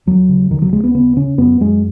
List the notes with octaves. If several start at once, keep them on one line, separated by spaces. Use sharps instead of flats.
D#2 F#3
C#3
D#2 D#3
F#3
D#2 G#3
B3
C#3 B3
C#3 C#4
F#2 B3
F#2 G#3